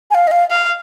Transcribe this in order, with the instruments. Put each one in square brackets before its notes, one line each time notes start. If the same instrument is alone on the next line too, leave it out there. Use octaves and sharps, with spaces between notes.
[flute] G#5
F5
D#5
F5
[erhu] F5